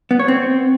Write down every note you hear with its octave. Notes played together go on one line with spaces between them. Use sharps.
B3
C#5
C4